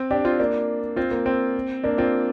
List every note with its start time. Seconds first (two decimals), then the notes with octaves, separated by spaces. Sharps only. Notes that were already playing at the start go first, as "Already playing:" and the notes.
Already playing: C4
0.11 D4 G4
0.25 C4 F4
0.39 A#3 D4
0.96 C4 F4
1.11 A#3
1.26 C4
1.84 A#3 D4
1.98 C4 F4